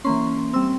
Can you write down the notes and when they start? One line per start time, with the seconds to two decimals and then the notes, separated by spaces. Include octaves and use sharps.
0.04 E3 A#3 C#4 C6
0.53 G3 C4 E6